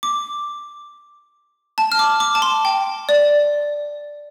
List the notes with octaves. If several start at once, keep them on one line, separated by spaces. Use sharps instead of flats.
D6
A5
F6
D6
D6
A5
C6
G5
D5